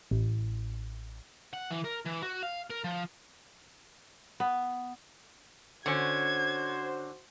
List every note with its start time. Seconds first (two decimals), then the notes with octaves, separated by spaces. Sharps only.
0.11 A1
1.54 F#5
1.70 E3
1.84 A#4
2.05 E3
2.22 F#4
2.43 F5
2.70 A#4
2.84 F3
4.40 B3
5.86 D3 C#4 F#4 C5 G#6